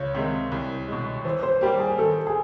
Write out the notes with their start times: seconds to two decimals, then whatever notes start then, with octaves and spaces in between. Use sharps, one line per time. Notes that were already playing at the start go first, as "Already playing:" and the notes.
Already playing: C#2 C#5
0.14 C3 D#3 G#3
0.52 C2
0.88 B2 G#3
1.25 E3 C5
1.43 C5
1.61 G3 A#3 G4
1.80 G#4
1.98 D#3 A4
2.27 G#4